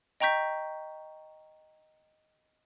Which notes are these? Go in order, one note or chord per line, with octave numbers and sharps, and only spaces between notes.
D#5 G5 A#5 C#6 G6 B6